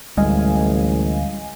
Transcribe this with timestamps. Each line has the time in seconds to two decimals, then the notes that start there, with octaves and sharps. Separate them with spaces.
0.17 A1 D2 G3 G#3 D#5 F5 G#5